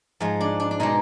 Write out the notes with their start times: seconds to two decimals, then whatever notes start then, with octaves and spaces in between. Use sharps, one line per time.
0.20 G#2 F3 G#3
0.41 D4
0.60 D4
0.71 D4
0.80 B2 G#3 D#4